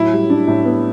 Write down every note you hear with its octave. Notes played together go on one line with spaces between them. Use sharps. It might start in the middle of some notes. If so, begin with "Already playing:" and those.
Already playing: A2 F#3 E4
G3
D4
A2
B3